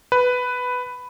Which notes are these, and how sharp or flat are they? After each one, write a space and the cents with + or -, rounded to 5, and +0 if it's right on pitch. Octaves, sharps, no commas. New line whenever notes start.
B4 +5